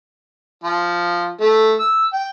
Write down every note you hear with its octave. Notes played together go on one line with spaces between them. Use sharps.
F3
A3
E6
G5